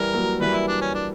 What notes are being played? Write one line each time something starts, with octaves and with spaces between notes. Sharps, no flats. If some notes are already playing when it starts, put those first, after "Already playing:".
Already playing: E3 G3 A#4
F#3 A#3
E3 G3 B4
E4
D4
C#4
D4